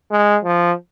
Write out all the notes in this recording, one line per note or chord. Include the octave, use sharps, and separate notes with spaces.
G#3
F3